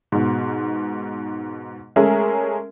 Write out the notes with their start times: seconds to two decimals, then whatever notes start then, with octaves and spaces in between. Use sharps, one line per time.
0.12 G#2 B2
1.96 G#3 A3 C#4 G#4 A#4 E5